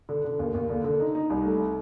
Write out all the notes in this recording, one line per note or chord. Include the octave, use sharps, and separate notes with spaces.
D3
D3
D#2
D#2
D3
D3
D#4
D#4
C2
A3